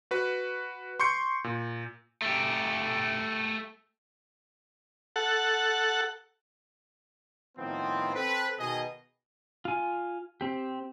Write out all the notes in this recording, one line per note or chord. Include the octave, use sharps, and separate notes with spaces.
F#4 B4
C6 C#6 G6 C#7
A#2
A3 G4
A4 F#5
A2 D#3 F3 B3 C4
C4 A4 B4
B2 D#3 G#4 D#5
F4 G#5
C4 G4